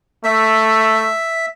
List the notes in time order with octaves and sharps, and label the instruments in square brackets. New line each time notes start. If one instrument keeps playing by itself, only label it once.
[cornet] A3 [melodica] E5